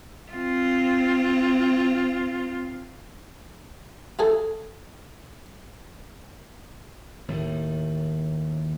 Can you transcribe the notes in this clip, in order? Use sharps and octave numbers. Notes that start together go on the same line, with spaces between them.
C4 F4
E4 G#4 A4
D#2 A2 D#3